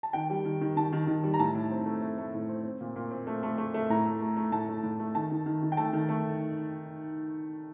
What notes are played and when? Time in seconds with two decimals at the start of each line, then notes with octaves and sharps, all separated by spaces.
0.03 A5
0.13 D#3 G5
0.30 G3
0.45 D#3
0.61 D#3
0.76 D#3 A5
0.93 D#3
1.07 D#3
1.24 G3
1.34 A#5
1.39 A2 A5
1.55 A2
1.71 C4
1.86 A3
2.01 A3
2.18 A3
2.34 A2
2.49 C4
2.64 C4
2.81 A#2
2.96 A#2
3.11 C4
3.27 A3
3.43 A3
3.58 A3
3.74 A3
3.90 A2 A#5
4.06 A3
4.22 A3
4.37 A3
4.52 A2 A5
4.69 A3
4.83 A2
5.00 A3
5.15 D#3 A5
5.31 D#3
5.46 D#3
5.63 D#3
5.72 G5
5.77 A3 A5
5.93 D#3
6.09 A3